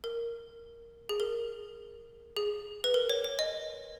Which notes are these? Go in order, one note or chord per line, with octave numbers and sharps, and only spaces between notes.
A#4
G#4
A#4
G#4
B4
A#4
C#5
C#5
D#5